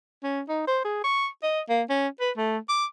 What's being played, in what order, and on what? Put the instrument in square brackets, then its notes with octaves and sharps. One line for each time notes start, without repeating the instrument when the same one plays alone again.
[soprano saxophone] C#4
D#4
C5
G#4
C#6
D#5
A#3
C#4
B4
A3
D6